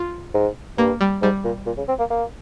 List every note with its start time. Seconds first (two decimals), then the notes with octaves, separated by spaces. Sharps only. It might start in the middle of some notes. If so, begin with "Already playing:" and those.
Already playing: F4
0.34 G#2
0.78 G2 A#3
1.01 G3
1.22 G#2 G3
1.45 A#2
1.66 A#2
1.78 C#3
1.88 C4
1.99 A#3
2.10 A#3